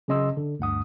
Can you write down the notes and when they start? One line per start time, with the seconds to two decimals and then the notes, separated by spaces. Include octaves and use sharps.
0.08 C#3 F#3 C#4 D#5 C6 E6
0.37 D3
0.59 D2 G2 F#5 D#6